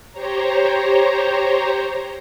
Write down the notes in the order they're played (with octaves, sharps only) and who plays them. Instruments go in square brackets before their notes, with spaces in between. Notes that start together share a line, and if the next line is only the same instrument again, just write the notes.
[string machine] G4 C5 C#5 A#5